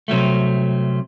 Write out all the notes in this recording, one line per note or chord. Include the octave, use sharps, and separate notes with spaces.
C3 F#3 G3 A3